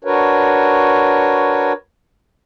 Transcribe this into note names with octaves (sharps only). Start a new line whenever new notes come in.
D4 F#4 A#4 B4 C#5